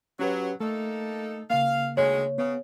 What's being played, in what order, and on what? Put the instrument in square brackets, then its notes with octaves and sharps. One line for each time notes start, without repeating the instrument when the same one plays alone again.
[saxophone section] F#3 [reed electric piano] C#4 G4 B4
[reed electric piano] A3 [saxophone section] A#3 D#4 A4
[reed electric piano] C#3 A#3 [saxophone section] F5
[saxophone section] D2 D#3 G#3 [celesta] C#5
[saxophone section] C#3 [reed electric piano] B3